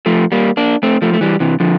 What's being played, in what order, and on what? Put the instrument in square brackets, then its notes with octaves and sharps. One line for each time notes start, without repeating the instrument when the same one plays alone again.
[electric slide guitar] F3 A3
G3 A#3
A#3 D4
A3 C4
F3 A3
A3
E3 G3
C3 E3
D3 F3